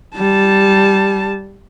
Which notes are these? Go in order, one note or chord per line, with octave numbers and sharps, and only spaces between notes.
G3 A5